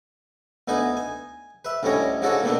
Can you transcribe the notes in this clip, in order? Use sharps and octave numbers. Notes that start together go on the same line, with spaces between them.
D2 B3 D#4 G#5 D#6
G#5
B4 E5
D2 A2 G3 C#4 C#5 D#5
G#2 C#3 C#4 F#4 A4 D5
B2 D#3 A3 A#3 D4